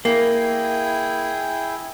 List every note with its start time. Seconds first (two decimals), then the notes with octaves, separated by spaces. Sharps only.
0.05 A#3 E4 G#4 G5